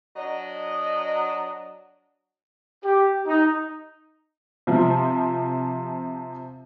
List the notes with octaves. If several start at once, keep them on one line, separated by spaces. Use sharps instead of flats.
F#3 D4 D#5
G4
D#4
C3 F3